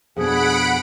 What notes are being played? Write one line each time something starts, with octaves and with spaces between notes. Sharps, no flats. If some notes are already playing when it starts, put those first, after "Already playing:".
F2 B2 D4 G#4 F#5 B5 D7